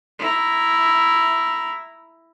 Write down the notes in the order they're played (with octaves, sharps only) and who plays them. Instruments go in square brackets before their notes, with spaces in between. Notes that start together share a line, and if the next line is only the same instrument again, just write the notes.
[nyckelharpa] E4 A#5